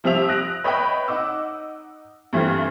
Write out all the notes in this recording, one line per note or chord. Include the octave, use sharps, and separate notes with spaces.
C3 F3 G3 E5 E6 F7
D#6 F#6 A#6 D7
B4 C#5 D#5 E5 G5 B5
D#4 F#5 D6 E6
G2 E3 A3 C4 F4